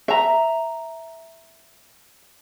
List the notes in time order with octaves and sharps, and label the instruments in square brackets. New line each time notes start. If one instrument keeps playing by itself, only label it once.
[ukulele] E5 A#5